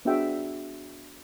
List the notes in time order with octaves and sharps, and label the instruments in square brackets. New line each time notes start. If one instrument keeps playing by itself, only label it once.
[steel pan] B3 D4 F#4 G#4 E5 G5